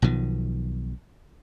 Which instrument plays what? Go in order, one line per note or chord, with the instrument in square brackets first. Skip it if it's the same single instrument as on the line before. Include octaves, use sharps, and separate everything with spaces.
[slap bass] B1 B2 D#3 F3